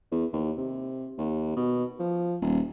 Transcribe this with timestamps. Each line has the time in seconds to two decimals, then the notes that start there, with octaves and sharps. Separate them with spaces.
0.11 E2
0.33 D#2
0.58 C3
1.18 D#2
1.56 B2
1.99 F3
2.42 D#1